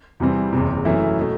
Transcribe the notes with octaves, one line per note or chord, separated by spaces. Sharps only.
E2 C3 E3 G3 C4
F#1 E2 C3
F#2 E3 A3 E4
B2 A3